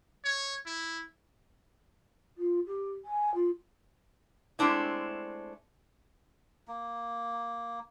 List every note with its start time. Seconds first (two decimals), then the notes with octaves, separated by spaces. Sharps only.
0.24 C#5
0.66 E4
2.37 F4
2.66 G4
3.05 G#5
3.34 F4
4.59 G#3 A3 C4 D4 E4
6.68 A#3